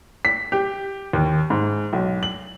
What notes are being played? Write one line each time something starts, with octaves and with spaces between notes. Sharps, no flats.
B6
G4
D#2
G#2
B1
F#7